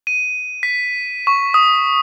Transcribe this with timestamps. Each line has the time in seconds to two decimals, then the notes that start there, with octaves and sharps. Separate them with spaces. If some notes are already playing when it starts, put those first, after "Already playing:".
0.07 D#7
0.63 B6
1.27 C#6
1.54 D#6